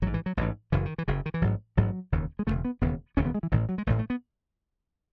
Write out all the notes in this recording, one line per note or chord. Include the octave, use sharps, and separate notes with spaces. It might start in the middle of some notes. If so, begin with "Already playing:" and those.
A1 G#2 F#3
E3
F#3
A1 G#2 E3
F#1 F#2 C#3 E3
D#3
E3
F#1 F#2 C#3
D#3
E3
A1 G#2 F#3
A1 G#2 F#3
E1 D#2 C#3
G#3
E1 D#2 C#3 A3
B3
E1 D#2 C#3 B3
E1 D#2 C#3 C#4
B3
G#3
E3
A1 A2 D#3
F#3
G#3
A1 A2 A3
A3
B3